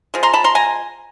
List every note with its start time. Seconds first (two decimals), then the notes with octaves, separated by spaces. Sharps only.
0.14 F3 G#3
0.23 A#5 C6
0.33 A5 B5
0.44 A#5 C6
0.55 G#5 A#5